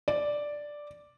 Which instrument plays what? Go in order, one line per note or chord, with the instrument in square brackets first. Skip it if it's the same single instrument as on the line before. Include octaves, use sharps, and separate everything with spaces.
[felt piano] D5